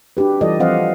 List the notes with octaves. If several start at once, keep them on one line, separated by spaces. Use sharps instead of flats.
D4 F#4 G4 B4
E3 G3 F4 A4 D5 D#5
F3 C4 C5 D#5 F5 F#5